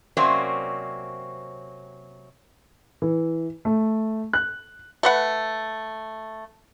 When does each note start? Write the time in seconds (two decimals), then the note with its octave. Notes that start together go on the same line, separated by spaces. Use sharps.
0.17 C3 F#3 A#3 C4 C#4 D5
3.02 E3
3.65 A3
4.33 F#6
5.03 A3 B4 F#5